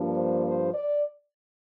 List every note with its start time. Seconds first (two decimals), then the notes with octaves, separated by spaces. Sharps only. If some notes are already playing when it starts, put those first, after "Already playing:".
Already playing: G2 F3 A#3 D4
0.16 C5
0.45 C5
0.74 D5